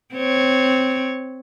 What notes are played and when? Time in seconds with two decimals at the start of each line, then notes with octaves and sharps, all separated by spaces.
0.15 C4 C#5